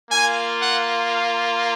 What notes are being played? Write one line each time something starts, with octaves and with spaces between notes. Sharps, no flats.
A#3 F4 G#5
F#5
F5